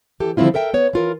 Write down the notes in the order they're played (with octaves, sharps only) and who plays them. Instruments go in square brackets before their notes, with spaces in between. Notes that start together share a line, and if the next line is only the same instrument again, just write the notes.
[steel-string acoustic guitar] E3 G4 A4
D3 F3 G3 C4 E4 F4
A4 A#4 E5 G5
B3 C#5
E3 F4 A#4